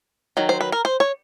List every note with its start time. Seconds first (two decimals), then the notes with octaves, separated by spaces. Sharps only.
0.37 D#3 F#3
0.49 C5
0.61 B4
0.72 A#4
0.85 C5
1.00 C#5